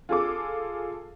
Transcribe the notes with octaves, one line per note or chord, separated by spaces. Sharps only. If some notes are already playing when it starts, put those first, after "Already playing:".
F4 G#4 A4 D6